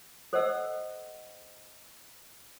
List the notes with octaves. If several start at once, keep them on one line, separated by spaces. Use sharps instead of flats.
A4 C5 D5 D#5 F#5 E6